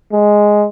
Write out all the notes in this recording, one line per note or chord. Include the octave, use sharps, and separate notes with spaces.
G#3